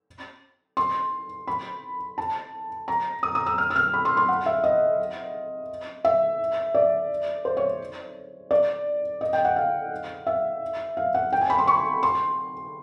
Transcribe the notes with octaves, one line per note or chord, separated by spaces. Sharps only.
C6
B5
A5
A#5
D#6
D#6
E6
F6
E6
F6
B5
C6
C6
F#5
E5
D#5
E5
D5
C5
C#5
D5
D#5
G5
F#5
F5
E5
F5
F#5
G5
G#5
B5
C6
C#6
C6